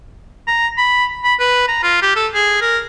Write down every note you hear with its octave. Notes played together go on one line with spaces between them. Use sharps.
A#5
B5
B5
B4
A#5
F4
G4
A4
G#4
A#4